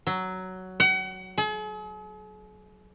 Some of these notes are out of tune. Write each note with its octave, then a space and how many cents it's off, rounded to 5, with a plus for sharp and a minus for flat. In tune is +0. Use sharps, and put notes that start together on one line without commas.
F#3 +10
F#5 +35
G#4 +45